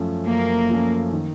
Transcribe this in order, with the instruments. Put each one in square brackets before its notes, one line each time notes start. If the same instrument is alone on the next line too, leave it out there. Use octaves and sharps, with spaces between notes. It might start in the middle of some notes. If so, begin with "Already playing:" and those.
Already playing: [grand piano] F#2 F3 A3 C#4
[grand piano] F#2 [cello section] A#3
[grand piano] F3 A3 C#4
D#3